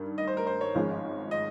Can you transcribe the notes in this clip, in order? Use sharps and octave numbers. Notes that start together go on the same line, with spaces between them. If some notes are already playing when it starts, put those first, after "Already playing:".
Already playing: G2 D#3
D#5
C5
A#4
C5
C#5
G#1 G#2 F3 G#3 C#4
D#5